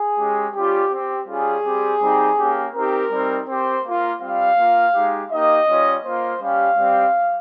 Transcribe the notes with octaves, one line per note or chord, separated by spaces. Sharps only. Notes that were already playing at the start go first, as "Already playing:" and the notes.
Already playing: G#4
G#3 C#4 G4
G3 C#4 F4 G4
C4 G4
G3 C#4 F4 G#4
G3 C4 G4
G3 C4 D#4 G4
A#3 C#4 G4
C4 D#4 G4 A#4
G3 C4 D#4
C4 G4 C5
A#3 F4
G3 C4 F4 F5
A#3 F4
G#3 D#4 G4
A#3 D#4 G4 D#5
G3 C#4 F4
A#3 F4 C5
G3 C#4 G4 F5
G3 C4 G4